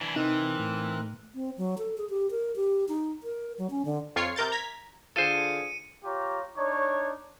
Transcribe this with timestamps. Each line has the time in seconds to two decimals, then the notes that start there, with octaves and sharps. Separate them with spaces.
0.01 E3 D4 G#5 B5
0.16 C3 E3 C4 D#4 A#4 F#6
0.59 A2
1.35 C4
1.58 F#3
1.78 A4
1.98 G#4
2.10 G4
2.31 A#4
2.56 G4
2.89 D#4
3.23 A#4
3.58 F#3
3.70 C#4
3.85 D3
4.16 F2 F4 C#5 C7
4.36 C3 A#4 G6 A6
4.52 A#5 G#6 B6
5.16 D3 F4 G#4 A4 C5 C#7 D#7
6.04 F4 G4 C#5 A#5
6.57 D4 D#4 C#5